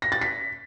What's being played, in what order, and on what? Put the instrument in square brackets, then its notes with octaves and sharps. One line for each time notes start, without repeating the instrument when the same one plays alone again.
[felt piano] A#6
A6
B6